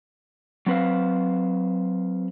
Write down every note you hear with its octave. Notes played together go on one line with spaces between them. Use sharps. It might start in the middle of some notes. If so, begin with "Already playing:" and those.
F#3 C4 B4 C5 F5